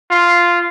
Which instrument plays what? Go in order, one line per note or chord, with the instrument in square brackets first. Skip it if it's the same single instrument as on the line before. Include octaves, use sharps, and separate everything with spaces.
[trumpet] F4